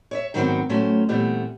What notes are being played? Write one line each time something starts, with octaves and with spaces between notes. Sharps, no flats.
C#5 D#5 E5
G#2 D#3 F#3 G3 B3 C4
A2 F#3 A3 C#4 C5
A#2 E3 G3 A3 B3 C4